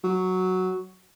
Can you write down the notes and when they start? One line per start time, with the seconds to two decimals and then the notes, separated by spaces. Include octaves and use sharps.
0.04 F#3